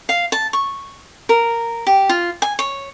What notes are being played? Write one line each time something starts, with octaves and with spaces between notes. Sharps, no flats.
F5
A5
C#6
A#4
G4
F4
G#5
C#5